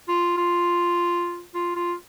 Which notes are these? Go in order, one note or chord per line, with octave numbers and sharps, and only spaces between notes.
F4
F4
F4
F4